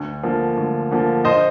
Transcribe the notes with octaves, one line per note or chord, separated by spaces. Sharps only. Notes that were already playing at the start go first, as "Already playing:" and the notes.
Already playing: D2
D3 F3 A#3
D2
D3 F3 A#3
A#1 C5 D#5